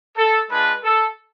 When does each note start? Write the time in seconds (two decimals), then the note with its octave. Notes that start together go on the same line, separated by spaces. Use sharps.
0.17 A4
0.50 G#3 D4 F4 B4
0.84 A4